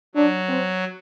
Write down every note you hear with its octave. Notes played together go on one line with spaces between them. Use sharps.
F#3 D4
C4